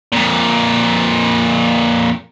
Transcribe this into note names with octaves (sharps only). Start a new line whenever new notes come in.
F2 A#2